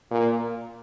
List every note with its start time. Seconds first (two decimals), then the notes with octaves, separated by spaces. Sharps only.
0.11 A#2